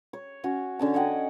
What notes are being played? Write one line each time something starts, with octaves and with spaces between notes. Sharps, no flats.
C#5
C#4 F#4
D3 C#4 A5
C#5 D#5 F#5 G5